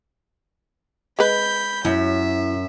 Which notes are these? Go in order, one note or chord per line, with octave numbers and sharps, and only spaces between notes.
G#3 B4 B5 G6
F#2 E4 E5